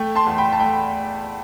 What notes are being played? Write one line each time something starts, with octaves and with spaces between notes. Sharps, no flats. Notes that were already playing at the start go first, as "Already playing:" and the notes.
Already playing: A3 G5
A5 C6
E2
G5 B5
A5
A3 G5